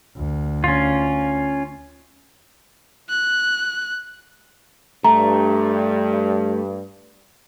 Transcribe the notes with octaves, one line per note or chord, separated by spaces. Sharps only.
D2
C#4 F4
F#6
G2 A3 A#5